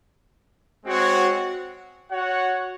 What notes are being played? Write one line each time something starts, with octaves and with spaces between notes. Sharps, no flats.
G#3 C4 F#4 C#5 F#5
F#4 C#5 F#5